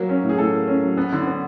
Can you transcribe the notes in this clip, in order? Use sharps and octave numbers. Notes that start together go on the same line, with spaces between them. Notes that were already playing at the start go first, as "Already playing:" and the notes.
Already playing: F#3 A#3
C#4
A2
G#4
A2 A4
A#3
C#4
F#3
B3
D3
B3